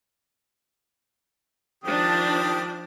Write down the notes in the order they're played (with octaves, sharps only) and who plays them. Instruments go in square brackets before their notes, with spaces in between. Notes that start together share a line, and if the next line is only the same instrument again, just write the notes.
[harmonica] D#3 G4 D#6 [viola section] F3 D4